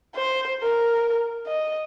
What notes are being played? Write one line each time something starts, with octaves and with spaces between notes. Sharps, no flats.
C5
A#4
D#5